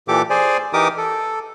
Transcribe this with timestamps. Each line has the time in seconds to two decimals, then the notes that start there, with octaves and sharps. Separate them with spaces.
0.08 A#2 E3 G4 A4 D6
0.30 G#4 C5 D5 G#5
0.73 E3 D#4 G4 A#4 D6 D#6
0.97 A4